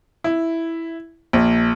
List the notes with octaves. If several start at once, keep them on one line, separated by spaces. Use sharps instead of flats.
E4
A#1